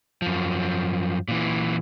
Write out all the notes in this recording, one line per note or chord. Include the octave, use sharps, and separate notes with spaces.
F#2 F3
A#2 E3